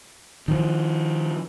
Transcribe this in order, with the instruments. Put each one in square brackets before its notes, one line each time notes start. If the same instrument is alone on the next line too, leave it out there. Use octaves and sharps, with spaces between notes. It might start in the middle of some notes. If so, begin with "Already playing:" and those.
[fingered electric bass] D#3 F3